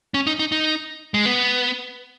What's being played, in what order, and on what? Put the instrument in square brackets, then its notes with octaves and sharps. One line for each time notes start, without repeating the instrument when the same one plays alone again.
[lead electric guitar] C#4
D#4
D#4
D#4
G#3
B3